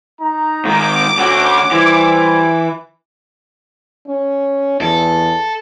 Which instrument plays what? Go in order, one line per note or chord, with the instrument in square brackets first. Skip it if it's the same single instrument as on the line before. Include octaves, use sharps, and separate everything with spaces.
[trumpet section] D#4 A#5
[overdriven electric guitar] G#2 D#3 [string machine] D6
[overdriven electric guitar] D2 F#4 [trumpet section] C#4 F#5
[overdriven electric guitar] E3 [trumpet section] G3 C5
[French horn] C#4
[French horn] E2 [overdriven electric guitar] A4